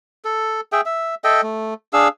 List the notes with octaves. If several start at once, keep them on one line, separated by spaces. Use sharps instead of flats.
A4
G#4 E5 G5
E5
A4 D#5 E5 G5
A3
D4 G#4 F5 E6